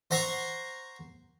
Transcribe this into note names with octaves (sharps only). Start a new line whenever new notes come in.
C5 F#5 A#5 C6 C#6